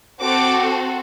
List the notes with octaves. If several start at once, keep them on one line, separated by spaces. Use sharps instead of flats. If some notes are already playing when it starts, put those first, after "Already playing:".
C4 F#4 A4 D6